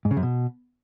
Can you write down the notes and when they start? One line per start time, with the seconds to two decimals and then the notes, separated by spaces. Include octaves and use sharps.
0.05 G#2
0.11 C#3
0.17 F#2
0.23 B2